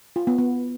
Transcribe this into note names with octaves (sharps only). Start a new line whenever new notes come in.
F4
B3
B3